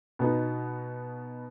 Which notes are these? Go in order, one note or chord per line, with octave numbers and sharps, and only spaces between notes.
B2 B3 D#4